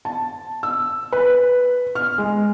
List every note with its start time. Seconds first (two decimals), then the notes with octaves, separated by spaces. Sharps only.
0.05 A5
0.63 E6
1.13 B4
1.95 F6
2.18 G#3